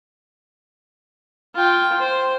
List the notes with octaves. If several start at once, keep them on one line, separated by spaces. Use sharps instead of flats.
F4 G5
C5